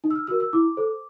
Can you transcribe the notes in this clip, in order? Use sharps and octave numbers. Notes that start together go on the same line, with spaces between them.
D#4
E6
F6
F#4 A#4 E6
E6
E4 D6
A4 C5